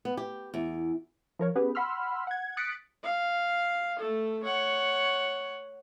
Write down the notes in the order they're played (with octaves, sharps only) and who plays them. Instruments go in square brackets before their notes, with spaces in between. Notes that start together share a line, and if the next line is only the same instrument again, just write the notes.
[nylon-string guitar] B3
G4
E2
[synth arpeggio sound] F3 A#4 C#5
B3 C#4 G4 G#4 B4
F#5 B5 C6 E6 F6
F#5 G#6
D#6 F#6 A6 B6 C#7 D7
[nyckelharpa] F5
A3 A4
C#5 F#5